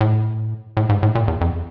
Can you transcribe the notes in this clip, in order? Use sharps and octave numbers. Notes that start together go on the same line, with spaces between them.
A2
A2
G#2
A2
A#2
E2
F2